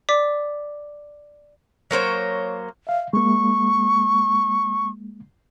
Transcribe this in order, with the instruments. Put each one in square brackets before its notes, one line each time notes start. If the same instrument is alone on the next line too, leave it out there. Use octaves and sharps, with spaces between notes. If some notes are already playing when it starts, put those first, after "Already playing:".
[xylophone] D5 D6 B6
[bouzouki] F#3 A#3 C5 C#5
[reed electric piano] E5 F5
[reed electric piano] G#3 A#3 [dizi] C#6